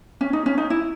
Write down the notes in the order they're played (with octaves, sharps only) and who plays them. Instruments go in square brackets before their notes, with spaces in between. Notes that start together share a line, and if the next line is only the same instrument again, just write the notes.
[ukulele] C#4
D#4
C#4
D#4
E4